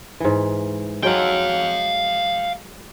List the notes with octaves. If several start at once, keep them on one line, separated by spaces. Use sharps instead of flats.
G#2 E3
F#3 G#3 F5 G5